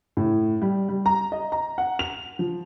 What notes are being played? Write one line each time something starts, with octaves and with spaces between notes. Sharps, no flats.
A2
G3
G3
A#5
D#5
A#5
F#5
F7
F3